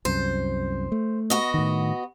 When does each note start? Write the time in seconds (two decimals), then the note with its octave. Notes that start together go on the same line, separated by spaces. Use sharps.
0.05 C2 F#2 C5
0.92 A3
1.30 B3 F#4 D#5
1.54 A2 D#3